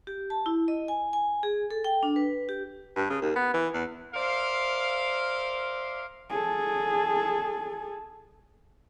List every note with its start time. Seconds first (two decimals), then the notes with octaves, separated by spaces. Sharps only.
0.07 G4
0.30 A5
0.46 E4
0.68 D#5
0.88 G#5
1.13 G#5
1.43 G#4
1.70 A4
1.84 G5
2.03 D4
2.16 B4
2.49 G4
2.96 G2
3.10 C#3
3.22 D#2
3.36 B3
3.54 E3
3.74 E2
4.14 A#4 C5 D5 E5 F5
6.30 G#4 A4